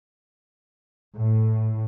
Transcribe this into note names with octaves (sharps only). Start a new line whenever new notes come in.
A2